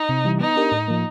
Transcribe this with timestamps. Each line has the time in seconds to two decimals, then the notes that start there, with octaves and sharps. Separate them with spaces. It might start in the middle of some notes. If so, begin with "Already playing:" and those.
Already playing: D#4
0.09 C3
0.25 E3 G3
0.40 B3 D#4
0.56 D4 G4 A#4
0.72 A2
0.88 F3 A#3